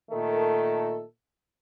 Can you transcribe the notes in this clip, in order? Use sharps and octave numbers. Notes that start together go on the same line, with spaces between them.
A#2 D#3 A3 A4